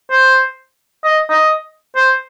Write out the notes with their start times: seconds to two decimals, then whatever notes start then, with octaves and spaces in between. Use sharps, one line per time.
0.11 C5
1.04 D#5
1.30 D#5
1.96 C5